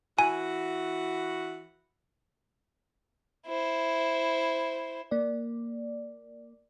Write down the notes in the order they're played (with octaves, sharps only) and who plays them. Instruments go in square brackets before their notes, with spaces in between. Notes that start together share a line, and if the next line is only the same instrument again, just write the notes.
[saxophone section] E3 F#4 [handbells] G#5
[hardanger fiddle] E4 C5
[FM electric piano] A#3 D5